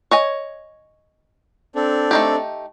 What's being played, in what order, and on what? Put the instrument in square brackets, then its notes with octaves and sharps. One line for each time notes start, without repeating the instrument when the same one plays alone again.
[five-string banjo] C#5 D#5 G#5
[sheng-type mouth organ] C4 D4 A4
[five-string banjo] A3 D#4 G4